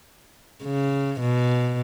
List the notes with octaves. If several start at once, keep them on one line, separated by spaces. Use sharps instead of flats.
C#3
B2